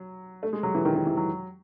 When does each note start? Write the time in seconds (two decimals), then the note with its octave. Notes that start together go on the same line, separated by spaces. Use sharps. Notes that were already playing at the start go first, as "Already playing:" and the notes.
Already playing: F#3
0.43 A3
0.53 G#3
0.63 F#3
0.75 E3
0.85 D#3
0.96 D#3
1.06 E3
1.17 F#3